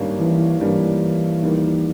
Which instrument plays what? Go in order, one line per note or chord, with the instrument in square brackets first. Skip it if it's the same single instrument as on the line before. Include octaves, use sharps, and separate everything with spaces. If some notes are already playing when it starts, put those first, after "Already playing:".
Already playing: [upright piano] G#1 G2 G3 A#3 C#4
[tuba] E3
[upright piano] G#1 G2 G3 A#3 C#4 [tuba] E3
[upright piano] D#2 D#3 G3 A#3